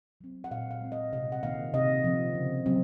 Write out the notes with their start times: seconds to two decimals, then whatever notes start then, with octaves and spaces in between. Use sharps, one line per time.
0.21 F#3 C4
0.44 F#5
0.51 A#2 F5
0.71 F5
0.81 G#3 C4
0.92 D#5
1.13 C3 D#5
1.32 F#5
1.43 D#3 A#3 F5
1.74 C3 D#5
2.04 F3 C4
2.35 C#3
2.66 F#3 C4